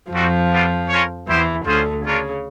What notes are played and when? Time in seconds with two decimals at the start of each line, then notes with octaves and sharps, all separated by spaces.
0.12 F2 F3 G3 C4 D#4 F#4
0.51 G3 B3 D4 F4
0.89 C#4 F4 A#4 C#5
1.27 E2 E3 B3 E4 G4 C5
1.66 D2 D3 C#4 F4 G#4 C5
2.05 C#3 A#3 D4 F4 A#4 C#5